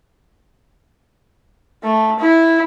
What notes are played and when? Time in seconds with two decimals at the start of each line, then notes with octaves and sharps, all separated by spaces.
1.83 A3
2.20 E4